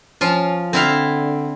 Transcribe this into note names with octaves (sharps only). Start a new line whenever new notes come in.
F3 C#4 F4
D3 C4 E4 F5